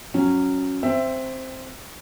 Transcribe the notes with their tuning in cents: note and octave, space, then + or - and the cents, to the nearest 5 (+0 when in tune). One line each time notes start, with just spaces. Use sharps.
F#3 +0 C#4 +0
C4 +0 E5 +10